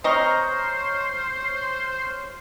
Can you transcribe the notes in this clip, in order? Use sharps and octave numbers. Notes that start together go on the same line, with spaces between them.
C4 C5 C#5 D#5 A#5 C#6 F6